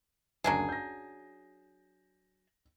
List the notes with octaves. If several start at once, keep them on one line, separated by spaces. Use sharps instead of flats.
F#1 D2 F#3 D4 G#4
G6 A#6